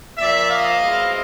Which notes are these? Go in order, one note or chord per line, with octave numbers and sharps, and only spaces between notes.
A#2 F3 A#3 D5 E5
D#5 F5
B2 G#3 C4 E4